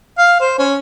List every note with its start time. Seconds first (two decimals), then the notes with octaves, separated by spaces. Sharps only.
0.18 F5
0.40 C5
0.59 C#4